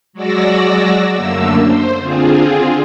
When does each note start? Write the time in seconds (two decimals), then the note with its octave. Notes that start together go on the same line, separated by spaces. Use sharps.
0.13 F#3 G#3 F#4 D5 E6 A#6
1.13 F#2 D3 A3 A#3 E6
1.63 C5
2.00 D3 C4 F4 G#4